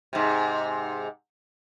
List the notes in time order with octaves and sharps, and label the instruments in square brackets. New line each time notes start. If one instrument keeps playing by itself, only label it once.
[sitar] G#2 C3